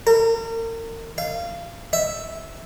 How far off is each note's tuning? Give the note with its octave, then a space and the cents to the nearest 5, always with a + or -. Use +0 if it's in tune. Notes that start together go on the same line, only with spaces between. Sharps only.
A#4 -40
F5 -25
E5 -5